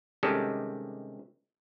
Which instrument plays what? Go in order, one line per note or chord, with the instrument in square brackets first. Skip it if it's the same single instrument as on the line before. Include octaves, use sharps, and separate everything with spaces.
[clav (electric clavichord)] C3 D#3 G3 G#3 C#4 A4